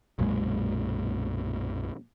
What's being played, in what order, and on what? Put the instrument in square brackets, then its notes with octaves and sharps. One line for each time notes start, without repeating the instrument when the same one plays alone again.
[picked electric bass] B1 F#2 A#2 G#3